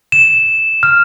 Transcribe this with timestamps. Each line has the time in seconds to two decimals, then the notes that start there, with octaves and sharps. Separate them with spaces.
0.12 E7
0.83 F6